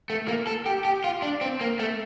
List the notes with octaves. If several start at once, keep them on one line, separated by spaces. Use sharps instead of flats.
A3
A#3
A4
G4
G4
F4
D4
C4
A#3
A3